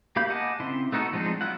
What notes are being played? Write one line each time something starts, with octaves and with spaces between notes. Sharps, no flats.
A#3 G4 F5 B5 G6
D#5 F#5 G#5 A5 D6
C#3 C4 E4 C6
A3 B3 D#4 F#4 A4
F3 G#3 C4 D4 D#4
F#3 B3 E4 F4 F#5